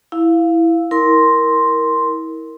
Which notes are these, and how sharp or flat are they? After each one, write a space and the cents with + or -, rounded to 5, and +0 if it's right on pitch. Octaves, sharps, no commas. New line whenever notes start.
E4 +0 F5 +0
E4 -30 A#4 +0 C6 +0